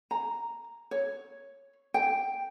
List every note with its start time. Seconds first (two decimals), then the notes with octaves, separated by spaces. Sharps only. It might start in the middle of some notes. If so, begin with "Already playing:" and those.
0.11 A#5
0.91 C#5
1.94 G5